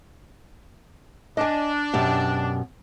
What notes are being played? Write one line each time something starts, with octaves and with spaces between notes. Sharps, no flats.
D4 D#5 G#5
F#2 B2 G4